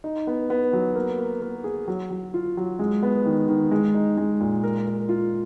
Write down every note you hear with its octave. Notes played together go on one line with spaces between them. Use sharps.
D#4
B3
B3
F#3
A#3
A#3
A#3
G#4
F#3
F#3
F4
F#3
G#3
B3
D#3
D#3
G#3
D#4
G#3
A#2
A#4
A#4
F4